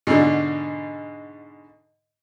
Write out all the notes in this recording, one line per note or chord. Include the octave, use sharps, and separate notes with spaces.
G#2 B2 D3